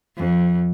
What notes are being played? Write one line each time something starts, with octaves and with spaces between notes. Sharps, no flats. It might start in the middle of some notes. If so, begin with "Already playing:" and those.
F2